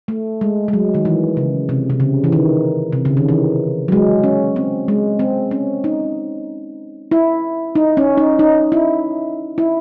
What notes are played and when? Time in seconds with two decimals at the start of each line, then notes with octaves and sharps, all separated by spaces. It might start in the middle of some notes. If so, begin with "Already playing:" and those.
0.08 A3
0.41 G#3
0.68 G#3
0.73 F#3
0.95 D#3
1.05 E3
1.37 C#3
1.69 C3
1.90 C3
2.00 C#3
2.24 E3
2.32 D#3
2.93 C3
3.05 C#3
3.17 D#3
3.29 E3
3.88 F#3
3.92 G#3
4.24 C#4
4.56 C4
4.88 G#3
5.19 C4
5.51 C#4
5.84 D#4
7.11 E4
7.75 D#4
7.97 C#4
8.18 D#4
8.39 D#4
8.72 E4
9.58 E4